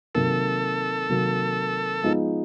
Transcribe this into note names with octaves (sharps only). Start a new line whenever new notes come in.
C3 D#3 F#3 A#3 A4
C3 D#3 F#3 A#3
F3 G#3 B3 D#4